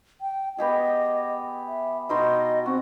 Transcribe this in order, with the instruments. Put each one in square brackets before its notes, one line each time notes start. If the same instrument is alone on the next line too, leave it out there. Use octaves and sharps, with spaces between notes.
[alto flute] G5
[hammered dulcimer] B3 G4 G#4 [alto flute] D#5
[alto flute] E5
[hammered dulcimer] B2 D#4 C6 [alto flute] D#5
[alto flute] C4 [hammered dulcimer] F#4